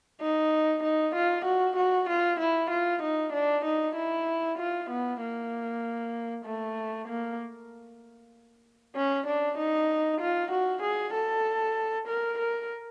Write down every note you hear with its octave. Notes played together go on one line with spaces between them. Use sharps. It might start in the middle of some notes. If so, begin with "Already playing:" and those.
D#4
D#4
F4
F#4
F#4
F4
E4
F4
D#4
D4
D#4
E4
F4
B3
A#3
A3
A#3
C#4
D4
D#4
F4
F#4
G#4
A4
A#4
A#4